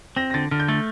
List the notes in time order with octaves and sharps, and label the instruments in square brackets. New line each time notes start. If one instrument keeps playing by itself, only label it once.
[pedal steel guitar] C4 [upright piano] A#6
[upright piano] A#6
[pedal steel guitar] D3 [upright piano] A6
[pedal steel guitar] D3 [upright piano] F6
[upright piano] G6
[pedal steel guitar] A3 [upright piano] A6